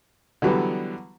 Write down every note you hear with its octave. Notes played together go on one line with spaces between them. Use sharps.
D3 E3 F#3 G3 B3